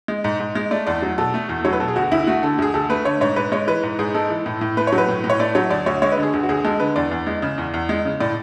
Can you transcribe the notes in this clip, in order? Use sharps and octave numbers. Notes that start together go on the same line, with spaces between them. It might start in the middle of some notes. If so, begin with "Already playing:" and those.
G#3
G#2
G#2
G#3
A3 D5
E2 D5
F#3
B2 A4
A3
E2
F#3 C#5
B4
B2 A4
G#4
D2 F#4
D2 E4
A3 F#4
D3 A4
D2 G#4
D2 A4
A3 B4
D3 C#5
G#2 C#5
G#2 B4
G#3 C#5
E3 B4
G#2
G#2 G#4
G#3 A4
E3
A2
A2
A3 B4
C#5
F#3
B4
A2
A2
C#5
A3 D5
F#3 C#5
D2 D5
D2 C#5
G#3 C#5
B4
D3
G#4
D2
F#4
D2 G#4
G#3 A4
D3 B4
E2 D5
E2
G#3
C#3
E2
E2
G#3
C#3
A2 D5